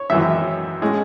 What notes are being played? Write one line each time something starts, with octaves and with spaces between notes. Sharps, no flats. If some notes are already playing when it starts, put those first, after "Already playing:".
Already playing: C#5
G#1 F#2 E3 E5
A2 G#3 C#4